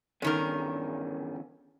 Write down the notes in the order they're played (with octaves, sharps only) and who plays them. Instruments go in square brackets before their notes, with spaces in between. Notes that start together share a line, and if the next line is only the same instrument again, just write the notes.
[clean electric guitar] E2 D3 C#4 [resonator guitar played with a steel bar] G2 D#3 A#4